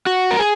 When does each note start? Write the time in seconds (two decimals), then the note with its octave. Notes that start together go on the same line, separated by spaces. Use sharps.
0.07 F#4
0.31 A#4
0.39 G#4